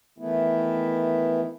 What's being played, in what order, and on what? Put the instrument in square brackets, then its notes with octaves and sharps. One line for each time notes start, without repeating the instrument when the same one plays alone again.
[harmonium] D#3 E3 A3 B3 E4